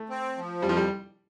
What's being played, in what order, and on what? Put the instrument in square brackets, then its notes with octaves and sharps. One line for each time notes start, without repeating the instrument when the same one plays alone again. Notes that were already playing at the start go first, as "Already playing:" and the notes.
Already playing: [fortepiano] A3
[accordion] C4
F3
[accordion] F2 [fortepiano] G3
[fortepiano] F3
G3